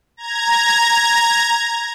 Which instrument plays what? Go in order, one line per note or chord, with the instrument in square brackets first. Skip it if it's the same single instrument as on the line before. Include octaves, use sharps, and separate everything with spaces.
[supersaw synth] A#5 G#6